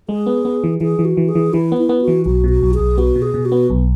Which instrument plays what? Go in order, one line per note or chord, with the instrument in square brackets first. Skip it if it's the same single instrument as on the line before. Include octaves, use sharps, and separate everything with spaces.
[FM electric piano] G#3 [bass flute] G#4
[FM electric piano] B3
B3
E3
[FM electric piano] E3 [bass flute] G#4
[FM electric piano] E3
[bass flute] F#4
[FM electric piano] E3
[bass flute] G#4
[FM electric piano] E3
[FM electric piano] E3 [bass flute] E4
[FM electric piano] B3
[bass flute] E4
[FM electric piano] B3
[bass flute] F#4
[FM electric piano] E3
[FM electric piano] B1 [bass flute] F#4
[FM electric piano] B2
[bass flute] F#4
[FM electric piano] B1
[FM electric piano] B1 [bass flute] G#4
[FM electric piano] B3 [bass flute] F#4
[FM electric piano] B2
[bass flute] G#4
[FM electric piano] B2
[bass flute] F#4
[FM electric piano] B3
B1